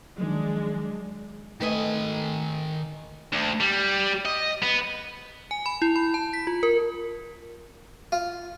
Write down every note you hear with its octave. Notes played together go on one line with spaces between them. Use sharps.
D#3 F3 F#3 G#3 D4
D#3 A3 B4 D#5 G#5
D2
G3
D#5
B3
G#5
B5
E4
B5
A5
B6
F4
A#4
F4